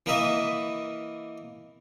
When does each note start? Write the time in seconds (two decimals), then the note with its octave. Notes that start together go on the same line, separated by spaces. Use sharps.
0.06 E3 A#3 B4 D#5 E5